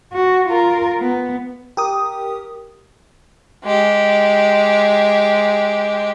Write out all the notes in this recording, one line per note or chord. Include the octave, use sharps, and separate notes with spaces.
F#4
F4 A#4
B3
G4 A#4 D#6
G#3 G4